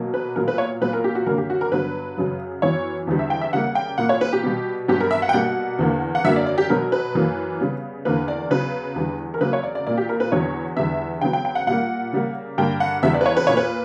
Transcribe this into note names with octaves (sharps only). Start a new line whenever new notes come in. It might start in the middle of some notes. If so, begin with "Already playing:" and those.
Already playing: B2 F#3 A#3
B4
A#2 F#3 B3 A#4
B4
C#5
A#2 F#3 B3 B4
A#4
G4
F#4
F#2 D3 A#3 A#4
G4
F#4
A#4
G2 D3 F#3 B3 B4
F#2 C#3 F#3
F#2 E3 B3 C#5
E2 D3 G3 B3
E5
G5
E5
C#3 G3 A#3 F#5
G5
A#2 A#3 F#5
C#5
B4
G4
B2 G3 B3
G2 F#3 B3 G4
A#4
E5
F#5
G5
B2 G3 A#3 F#5
E2 D3 A#3
F#5
F#2 D3 F#3 A#3 E5
D5
D5
G4
B2 F#3 B3 A#4
B4
F#2 E3 A#3
C#3 G3 B3
E2 D3 A#3 B4
D5
C#3 F#3 B3 B4
E2 D3 G3
A#4
C#3 F#3 A#3 B4
C#5
D5
D5
A#2 A#3 D5
G4
A#4
B4
E2 D3 F#3 B3 C#5
E2 D3 G3 B3 E5
C#3 F#3 B3 G5
G5
G5
F#5
A#2 G3 A#3 F#5
C#3 G3 A#3
G2 D3 A#3 G5
F#5
E2 C#3 G3 B3 E5
D5
B4
C#5
B4
A#2 A#3 C#5
B4